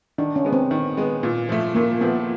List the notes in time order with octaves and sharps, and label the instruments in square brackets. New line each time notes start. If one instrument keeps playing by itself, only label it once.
[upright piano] D#3 [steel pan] D4
[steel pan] C#4
[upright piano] G#3 B3
[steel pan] C4
[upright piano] D#3
G#3 B3
A#2
F3 A3
[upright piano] A#2 [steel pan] A#3
[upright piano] F3 A3 [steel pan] B3